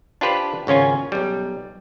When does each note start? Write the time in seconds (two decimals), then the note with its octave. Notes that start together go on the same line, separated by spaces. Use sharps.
0.21 D4 F4 G4 B4 C5 D5
0.67 G#1 C#3 C#4 F4 G#5
1.12 B1 G3